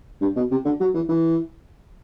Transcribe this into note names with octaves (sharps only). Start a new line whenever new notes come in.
G2
B2
C3
D3
F#3
E3
E3